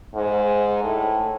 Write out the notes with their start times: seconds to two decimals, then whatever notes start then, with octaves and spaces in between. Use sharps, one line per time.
0.15 G#2
0.83 A2